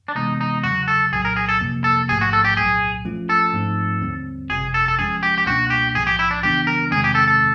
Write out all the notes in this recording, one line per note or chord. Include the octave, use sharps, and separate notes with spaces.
D4
C3 E3 G#3 B3 D#4
D#4
E2 C#3 F#3 F#4
A4
C2 A#2 F#3 G#4
A#4
G#4
A4
F2 C3 F3 A#3
A4
A1 G#2 F3 A3 G#4
F#4
A4
G4
C2 A#2 F#3 G#4
F3 A3 C#4 F4
A4
G#2 F3 A3 C4 D#4
D#2 D3 G3 C4
G1 F2 C3 G#4
A4
A4
F3 G#3 C#4 G#4
G4
G4
C#2 B2 G3 A#3 D4 F#4
G4
B1 A2 F3 G#4
G4
E4
D4
C#3 E3 G3 B3 D4 G4
A#4
E2 C3 D#3 G#3 C4 G#4
G4
A4
A4